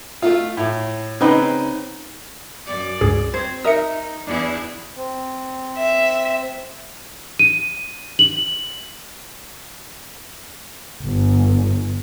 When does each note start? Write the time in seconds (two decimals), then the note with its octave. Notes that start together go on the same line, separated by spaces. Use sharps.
0.22 A3 F4
0.57 A2
1.20 C#3 C4 D#4 B4
2.66 F#2 D5
3.01 C#2 G2 G#4
3.34 C4 C5 G#6
3.64 D#4 A#4 E5 D#6 C#7
4.27 E2 D4 E4 G#4
4.95 C4
5.78 E5
7.39 D#7
8.19 F#7
11.04 G1